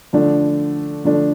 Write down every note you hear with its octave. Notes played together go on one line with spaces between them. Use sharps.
D3 F3 A3 D4
D3 F3 A3 D4